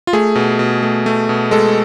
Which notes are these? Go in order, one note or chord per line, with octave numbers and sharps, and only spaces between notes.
F4
A3 G#4
B2
B2
A3
A3
B2
G#3 A4